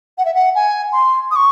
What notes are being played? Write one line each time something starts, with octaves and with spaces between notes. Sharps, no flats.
F#5
E5
F#5
G#5
C6
D#6
C#6